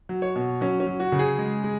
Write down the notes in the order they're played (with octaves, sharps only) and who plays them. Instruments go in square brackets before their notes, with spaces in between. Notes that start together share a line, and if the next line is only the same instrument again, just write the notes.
[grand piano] F#3
C#5
B2
F#3 C#4
C#4
F#3
F#4
C#3
G#4
G#3
G#3